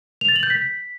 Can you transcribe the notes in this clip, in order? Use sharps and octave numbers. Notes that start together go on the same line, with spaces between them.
F7
A6
F#7
G6
B6